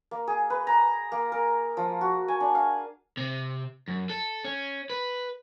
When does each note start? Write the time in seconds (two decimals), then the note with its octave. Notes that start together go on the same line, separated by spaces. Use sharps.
0.11 A#3
0.27 G#4
0.50 B4
0.67 A#5
1.12 A#3
1.32 A#4
1.77 F3
2.01 F#4
2.28 G#5
2.40 D4
2.55 F5
3.17 C3
3.88 F#2
4.10 A4
4.45 C#4
4.90 B4